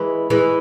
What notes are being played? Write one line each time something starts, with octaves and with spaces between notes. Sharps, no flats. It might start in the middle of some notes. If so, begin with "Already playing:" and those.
Already playing: E3 G#3
E3 G#3